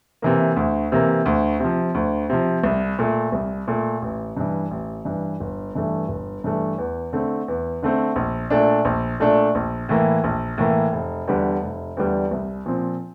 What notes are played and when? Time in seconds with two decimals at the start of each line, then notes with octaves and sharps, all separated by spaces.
0.22 C3 E3 A#3
0.56 D2
0.92 C3 E3 A#3
1.26 D2
1.60 C3 F3
1.94 D2
2.30 C3 F3
2.64 C2
2.99 A#2 A3
3.32 C2
3.67 A#2 A3
4.02 A1
4.37 G2 E3
4.71 A1
5.05 G2 E3
5.40 G1
5.75 G2 E3 A3
6.09 G1
6.44 G2 E3 A3
6.78 E2
7.13 D3 A3 C4
7.48 E2
7.82 D3 A3 C4
8.16 A#1
8.50 A#2 A3 D4
8.85 A#1
9.20 A#2 A3 D4
9.55 A#1
9.89 A2 E3 A#3
10.24 A#1
10.58 A2 E3 A#3
10.92 F1
11.27 E2 D3 G3
11.62 F1
11.97 E2 D3 G3
12.31 C2
12.66 A#2 F3 C4